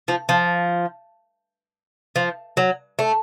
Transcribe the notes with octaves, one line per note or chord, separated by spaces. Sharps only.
F3
F3
F3
F#3
A3